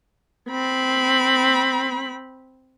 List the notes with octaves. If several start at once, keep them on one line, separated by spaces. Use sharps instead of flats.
C4 B5